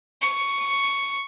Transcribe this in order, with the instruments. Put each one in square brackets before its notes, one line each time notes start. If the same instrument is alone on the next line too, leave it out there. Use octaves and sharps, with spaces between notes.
[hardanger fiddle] C#6